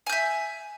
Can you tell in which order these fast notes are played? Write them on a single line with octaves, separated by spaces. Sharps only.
G#5 G6 E5